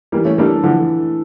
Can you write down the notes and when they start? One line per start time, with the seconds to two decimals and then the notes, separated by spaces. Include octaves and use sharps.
0.12 E3 G3 A#3
0.25 A3 C#4
0.38 G3 A3 A#3 D4 A4
0.63 D3 E3 F3